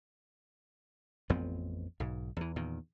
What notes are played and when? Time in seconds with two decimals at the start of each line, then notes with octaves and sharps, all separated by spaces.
1.30 A1 F2 B3 C4
2.00 B1 G#2
2.37 E2 E3
2.56 E2 A#2 D#3